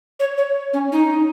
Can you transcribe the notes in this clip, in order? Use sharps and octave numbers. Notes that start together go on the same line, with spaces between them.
C#5
C#5
C#4
D#4